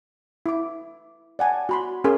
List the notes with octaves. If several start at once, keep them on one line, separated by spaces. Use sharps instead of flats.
E4 D6
D5 F#5 G#5 A5
F#4 B5 C6
C#4 G#4 A#4 C6